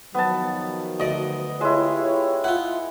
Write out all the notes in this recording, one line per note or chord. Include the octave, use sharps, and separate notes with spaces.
D#3 F3 F#3 B3 A5
D2 D5 D#5
G#3 E4 F4 G4 C#5
E4 F4 F#5